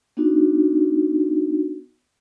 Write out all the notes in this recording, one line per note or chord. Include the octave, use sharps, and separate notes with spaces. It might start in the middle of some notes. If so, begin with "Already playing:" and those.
B3 D4 D#4 F#4